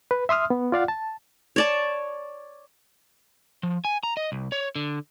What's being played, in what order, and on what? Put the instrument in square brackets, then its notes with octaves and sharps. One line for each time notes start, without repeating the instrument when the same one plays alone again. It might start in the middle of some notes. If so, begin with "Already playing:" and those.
[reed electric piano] B4
E5 C6 D#6 F6
B3
F4 D5 F5 F#5
A5
[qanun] C#5 D5 A5
[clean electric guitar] F3
G#5
A#5
D#5
C2
C#5
D3